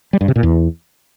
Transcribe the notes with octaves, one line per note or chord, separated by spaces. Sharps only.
G3
G2
C3
A#2
E2